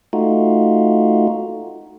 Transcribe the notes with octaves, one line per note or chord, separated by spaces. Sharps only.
A3 D#4 F4 F#4